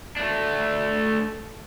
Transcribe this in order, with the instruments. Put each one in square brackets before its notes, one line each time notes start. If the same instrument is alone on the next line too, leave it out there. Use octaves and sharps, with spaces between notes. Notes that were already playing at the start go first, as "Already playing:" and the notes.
[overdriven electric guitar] A3 D4